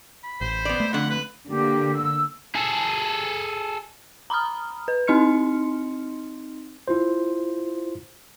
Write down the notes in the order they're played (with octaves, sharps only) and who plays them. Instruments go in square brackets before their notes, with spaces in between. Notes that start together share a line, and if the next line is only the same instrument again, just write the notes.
[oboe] B5
[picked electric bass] A1 [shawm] C5
[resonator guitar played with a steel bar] B3 D5
[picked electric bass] A3
[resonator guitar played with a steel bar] F2 D3 [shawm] F#5
[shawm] B4
[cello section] D3 A#3 [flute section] G4
[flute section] E6
[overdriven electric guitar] G#4 A4
[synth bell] A#5 B5 D#6 F6
B4
C4 D#4 D#5 C6 F6 C#7
[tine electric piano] E4 F4 C5